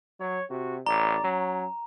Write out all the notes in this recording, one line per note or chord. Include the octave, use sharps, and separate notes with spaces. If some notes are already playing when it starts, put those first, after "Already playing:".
F#3 C#5
C3 F#4
A1 D5 A#5
F#3 C#4